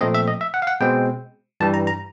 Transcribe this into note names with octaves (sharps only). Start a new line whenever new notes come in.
A#2 F3 A3 C4 D#5
E5
D#5
E5
F#5
F5
F#5
B2 G#3 C4 G5
G2 E3 G3 A5
A#5
A#5